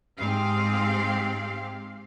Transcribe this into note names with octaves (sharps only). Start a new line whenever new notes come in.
G#2 C4 G4 F5